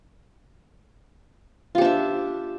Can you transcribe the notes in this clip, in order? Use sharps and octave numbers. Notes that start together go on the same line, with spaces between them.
D4 F4 G4 E5